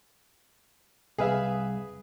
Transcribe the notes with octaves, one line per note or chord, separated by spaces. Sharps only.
C2 G#4 B4 E5 F5